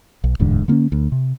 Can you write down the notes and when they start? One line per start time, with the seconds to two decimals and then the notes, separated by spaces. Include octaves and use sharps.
0.24 B1
0.40 D1 E2 G#2 D3
0.68 D3 A#3 C4 C#4
0.92 D2
1.12 C3